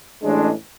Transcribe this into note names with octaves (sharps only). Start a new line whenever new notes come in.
A1 A2 G#3 D4